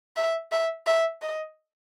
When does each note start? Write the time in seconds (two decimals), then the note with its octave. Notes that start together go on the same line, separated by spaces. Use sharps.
0.16 E5
0.52 E5
0.86 E5
1.22 D#5